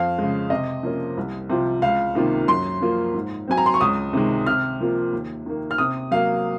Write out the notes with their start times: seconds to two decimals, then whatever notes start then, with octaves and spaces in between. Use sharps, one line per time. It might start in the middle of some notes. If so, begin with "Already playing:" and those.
Already playing: F2 F5
0.18 C#3 G#3
0.50 C3 D#5
0.83 F3 A#3 C#4 F4
1.17 C2
1.50 C3 F3 C4 F4
1.82 C#2 F5
2.15 C3 D#3 A#3 F4
2.48 F#2 C6
2.81 F3 A#3 F4
3.14 G#2
3.48 F#3 C4 G#5
3.58 A#5
3.66 C6
3.74 C#6
3.81 C#2 D#6
4.13 C3 D#3 G#3
4.47 C3 F6
4.80 F3 A#3 F4
5.12 D#2
5.46 D#3 A#3
5.71 F6
5.78 C3 D#6
6.11 F#3 A#3 F5